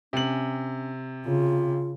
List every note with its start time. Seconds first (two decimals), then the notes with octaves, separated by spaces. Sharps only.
0.13 C3 C#4 F#7
1.26 C#3 F4